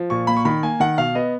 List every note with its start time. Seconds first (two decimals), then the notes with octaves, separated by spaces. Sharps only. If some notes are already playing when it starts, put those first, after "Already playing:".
Already playing: F3
0.10 A#2 C#6
0.27 A#3 B5
0.36 C#6
0.45 D#3 B5
0.63 A#3 G#5
0.80 D#3 F#5
0.98 B2 F5
1.15 B3 D#5